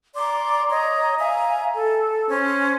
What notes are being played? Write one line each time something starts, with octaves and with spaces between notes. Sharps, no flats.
D5 A#5 C6 D6
C#5 D#5 A#5
E5 F5 G#5 A#5
A4
C#4 C5